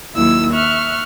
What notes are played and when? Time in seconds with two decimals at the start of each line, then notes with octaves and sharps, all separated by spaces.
0.13 D#2 F#3 E4 E6
0.51 E5 C#6 F6 F#6